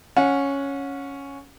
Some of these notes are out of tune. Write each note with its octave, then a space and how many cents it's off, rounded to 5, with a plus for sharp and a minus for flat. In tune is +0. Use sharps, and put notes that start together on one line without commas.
C#4 +0 F#5 -30